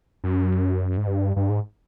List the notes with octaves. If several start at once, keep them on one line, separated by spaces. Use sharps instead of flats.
F#2
G#2
G2
G2
G#2